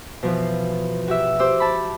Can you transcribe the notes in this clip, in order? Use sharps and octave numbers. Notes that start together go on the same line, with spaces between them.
B2 E3 F3
F#4 G4 E5
G4 C5 D6 E6
A5 B5